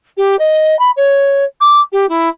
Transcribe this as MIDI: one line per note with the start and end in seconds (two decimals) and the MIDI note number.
0.17 0.36 67
0.39 0.78 75
0.79 0.91 83
0.96 1.44 73
1.61 1.80 86
1.92 2.06 67
2.09 2.29 64